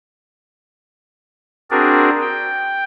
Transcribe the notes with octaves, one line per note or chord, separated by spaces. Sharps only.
C4 D4 F#4 G#4 A#4 D5
G5